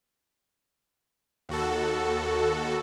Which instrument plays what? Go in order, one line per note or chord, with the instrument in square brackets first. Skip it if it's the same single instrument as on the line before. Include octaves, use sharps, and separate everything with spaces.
[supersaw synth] D#2 F#4 A4